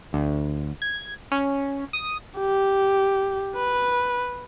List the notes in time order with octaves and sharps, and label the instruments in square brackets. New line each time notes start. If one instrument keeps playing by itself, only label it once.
[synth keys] D2
G#6
C#4
D#6
[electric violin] G4
B4